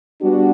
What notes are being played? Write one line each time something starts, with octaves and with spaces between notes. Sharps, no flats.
G3 B3 D4 F#4